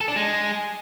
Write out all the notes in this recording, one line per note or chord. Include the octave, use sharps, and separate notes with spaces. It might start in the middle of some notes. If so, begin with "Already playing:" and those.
A4
D4
G#3